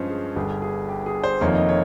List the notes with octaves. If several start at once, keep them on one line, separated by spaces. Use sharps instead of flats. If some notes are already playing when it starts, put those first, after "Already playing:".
Already playing: G2 F3 G#3 C#4 C5 D#5
G#4
G1 G2 G3 G#4
G#4
G4
G#4
C5
F1 F2 D#3 A#3 D#4 C#5
D#5
C#5